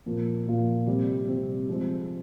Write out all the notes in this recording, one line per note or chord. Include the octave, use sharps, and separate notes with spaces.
A#2 F3 A#3 F4
A#2 F3 A#3 F4
C3 G3 C4
C3 G3 C4
F3 G#3 C4